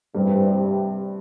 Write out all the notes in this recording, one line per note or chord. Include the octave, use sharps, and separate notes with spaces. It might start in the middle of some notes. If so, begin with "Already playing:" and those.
G2 C3 E3 G3 C4
C3 G3 C4 G4